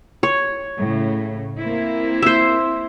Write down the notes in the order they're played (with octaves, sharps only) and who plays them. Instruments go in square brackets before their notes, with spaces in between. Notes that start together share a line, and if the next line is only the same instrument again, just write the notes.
[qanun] C#5
[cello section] A2 C#3
A#3 C4 E4
[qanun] C5 E5